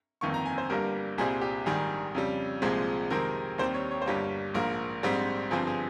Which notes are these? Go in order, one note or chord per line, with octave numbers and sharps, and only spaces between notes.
G1 F2 D#3 A#3 C#6
A#5
G#5
C5
G1 G2 G3 A#3 A#4
C2 A#2 G3 C4 G#4
G4
A#1 G#2 D#3 G3 G#4
F2 C#3 G3
C2 A#2 F3 G#3 C4
F2 C3 D#3 G#3 C4 A#4
D#2 D#3 G3 C4 C5
C#5
C#5
C5
G1 G2 G3 A#3 C#5
A#1 G#2 F3 A#3 A#4
A#1 G#2 G3 C4
G1 G2 F3 C4 G#4
G#4